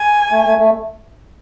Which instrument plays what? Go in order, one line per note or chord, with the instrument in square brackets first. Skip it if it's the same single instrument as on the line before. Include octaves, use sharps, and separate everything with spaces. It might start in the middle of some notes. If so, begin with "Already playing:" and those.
Already playing: [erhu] G#5
[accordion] A3
A3
A3